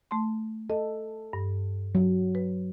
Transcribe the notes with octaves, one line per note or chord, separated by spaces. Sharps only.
A3 A5 C6
A4 D#5
G2
F#3
B4